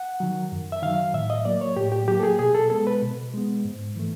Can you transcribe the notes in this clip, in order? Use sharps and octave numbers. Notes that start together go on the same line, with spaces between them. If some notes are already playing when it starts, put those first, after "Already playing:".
Already playing: F#5
D#3 F#3
F#2
E5
D#3 F#3 F5
A2 E5
D#5
F#3 A#3 D5
C#5
A2 G4
G4
F#3 A#3 G4
A4
G#4
B2 G#4
A4
G#3 B3 A4
B4
B2
G#3 B3
G#2
E3 A3